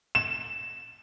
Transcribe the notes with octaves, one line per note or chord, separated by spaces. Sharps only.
E7